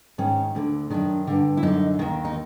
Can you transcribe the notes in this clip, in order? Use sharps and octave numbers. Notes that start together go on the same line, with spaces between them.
G#2 D#3 C#4
D2 D3
F#2 D#3 D4
G2 D3
E4
F#2 D3 D#4
D#2 D#3
D#4